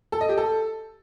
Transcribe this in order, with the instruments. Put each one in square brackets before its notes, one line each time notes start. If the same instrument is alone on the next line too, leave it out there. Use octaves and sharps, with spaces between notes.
[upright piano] A4
D#5
G4
A4